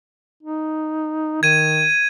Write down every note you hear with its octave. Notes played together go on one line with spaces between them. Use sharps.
D#4
D#3 G#6 D#7